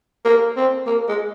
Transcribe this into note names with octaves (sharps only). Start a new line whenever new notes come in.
A#3
C4
A#3
G#3